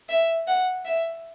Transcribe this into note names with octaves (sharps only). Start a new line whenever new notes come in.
E5
F#5
E5